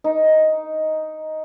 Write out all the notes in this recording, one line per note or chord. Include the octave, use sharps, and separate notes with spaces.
D#4